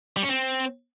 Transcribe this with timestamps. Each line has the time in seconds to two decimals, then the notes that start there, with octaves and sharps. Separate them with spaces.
0.17 G3
0.23 C#4
0.29 C4